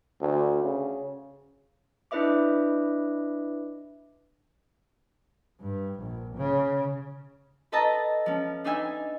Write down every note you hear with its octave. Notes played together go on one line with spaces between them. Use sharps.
D2
C#3
D4 E4 B4 D#5 E5 D6
G2
A#1
C#3
A4 B4 D#5 E5 A5 A#5
F3 C#4
D4 D#4 B4 E5 G#5